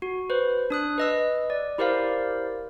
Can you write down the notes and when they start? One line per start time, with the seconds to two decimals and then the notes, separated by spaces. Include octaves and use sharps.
0.02 F#4
0.30 B4 C5
0.70 D4 D#6 F#6
0.98 B4 D#5 E6
1.50 D5
1.78 E4 G4 A#4 C5 D5 F5